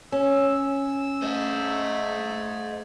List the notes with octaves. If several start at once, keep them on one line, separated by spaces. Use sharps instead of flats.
C#4 E6
A3 C5 D#5